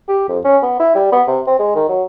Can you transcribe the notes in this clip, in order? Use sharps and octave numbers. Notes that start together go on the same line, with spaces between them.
G4
F2
C#4
B3
E4
G3
B3
C3
C4
G#3
D#3
F#3